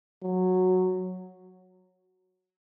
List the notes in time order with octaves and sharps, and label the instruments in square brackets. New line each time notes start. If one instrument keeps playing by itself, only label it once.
[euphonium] F#3